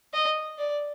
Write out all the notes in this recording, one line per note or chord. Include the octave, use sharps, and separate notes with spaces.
D#5
D5